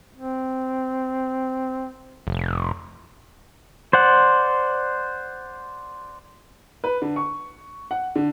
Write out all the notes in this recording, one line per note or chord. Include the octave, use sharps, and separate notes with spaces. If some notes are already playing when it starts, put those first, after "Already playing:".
C4
F1
C5 D5 F#5
B4
D3
C#6
F#5
D3